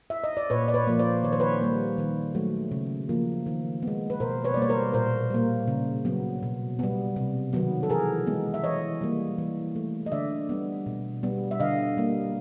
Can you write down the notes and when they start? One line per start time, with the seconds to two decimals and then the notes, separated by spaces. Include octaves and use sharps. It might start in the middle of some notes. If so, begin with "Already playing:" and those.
0.10 E5
0.24 D#5
0.37 D5
0.50 A#2 B4 C#5
0.68 D5
0.74 B4 C#5
0.87 F3 A#3
0.99 C5 D5
1.24 D#3 C#5
1.33 C5
1.40 B4 C#5
1.61 G3 A#3
1.98 D#3
2.35 F#3 A3
2.71 C#3
3.09 F3 A#3
3.46 D#3
3.82 B3
3.87 G#3
4.10 B4
4.20 B2 A#4 C5
4.45 B4 C#5
4.54 D5
4.57 G3 A#3 C#5
4.69 A#4 C5
4.93 A#2 A#4 C5
5.30 G3 A#3
5.68 C#3
6.05 F#3 B3
6.43 B2
6.79 G3 B3
7.16 C3
7.53 D#3 F#3 B3
7.83 A4
7.90 E3 G#4 A#4
8.27 G#3 B3
8.54 E5
8.64 E3 C#5 D#5
9.01 G3 A#3
9.38 E3
9.76 A3
10.06 D#5
10.12 D3 D5 E5
10.49 G3 B3
10.86 B2
11.23 G3 B3
11.51 E5
11.60 D3 D#5 F5
11.97 G3 A#3